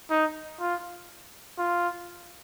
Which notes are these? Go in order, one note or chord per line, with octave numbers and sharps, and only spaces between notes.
D#4
F4
F4